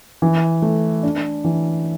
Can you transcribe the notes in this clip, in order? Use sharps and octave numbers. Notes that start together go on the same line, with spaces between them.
E3
A3
D4
E3